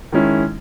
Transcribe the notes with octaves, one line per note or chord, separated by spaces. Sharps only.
D#3 G#3 C#4 E4